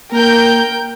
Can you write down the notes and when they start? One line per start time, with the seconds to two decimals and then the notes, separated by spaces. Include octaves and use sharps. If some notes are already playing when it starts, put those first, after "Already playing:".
0.12 A#3 A#4 G5 G6